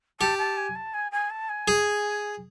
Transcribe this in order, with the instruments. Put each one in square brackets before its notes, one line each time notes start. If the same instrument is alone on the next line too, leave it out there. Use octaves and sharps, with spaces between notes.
[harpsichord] G4 [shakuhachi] A5
[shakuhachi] A5
G#5
A5
G#5
G#5
A5
G#5
[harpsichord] G#4